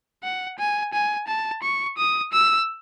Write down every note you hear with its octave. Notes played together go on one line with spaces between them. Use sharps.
F#5
G#5
G#5
A5
C#6
D#6
E6